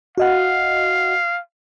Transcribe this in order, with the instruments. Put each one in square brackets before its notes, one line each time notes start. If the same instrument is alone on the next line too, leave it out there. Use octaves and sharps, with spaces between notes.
[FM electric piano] F#4 D#5 F#5 [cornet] F5